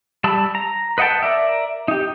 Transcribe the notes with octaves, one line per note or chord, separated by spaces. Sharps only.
G3 A5 B5 E6
A#5
B4 D#5 F#5 G5 A5
A#4 D5 E5
D#4 G4